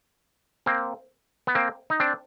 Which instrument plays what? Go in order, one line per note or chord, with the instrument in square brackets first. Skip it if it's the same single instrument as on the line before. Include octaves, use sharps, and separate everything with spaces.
[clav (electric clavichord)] A#3 C4
B3
A#3 C4
D#4
C4 D4